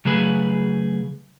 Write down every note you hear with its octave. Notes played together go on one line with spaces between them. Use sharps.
C#3 F#3 A3 G#4 B4